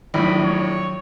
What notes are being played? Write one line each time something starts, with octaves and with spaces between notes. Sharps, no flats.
A#1 A2 D#3 F#3 B5
C#5